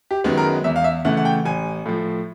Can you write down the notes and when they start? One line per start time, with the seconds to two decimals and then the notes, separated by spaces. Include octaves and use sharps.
0.11 G4
0.24 F#2 D#3 G#3 B3
0.37 A#4
0.64 E2 E5
0.76 F5
0.84 E5
1.05 C#3 E3 A3 F#5
1.17 F#5
1.25 G5
1.45 A1 G#5
1.86 A2 F3